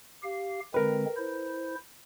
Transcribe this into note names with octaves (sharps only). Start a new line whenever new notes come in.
G4 F5
D3 G#3 C4 A#4 B4
E4 C5